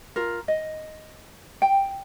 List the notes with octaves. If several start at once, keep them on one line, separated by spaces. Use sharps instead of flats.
F4 A#4
D#5
G5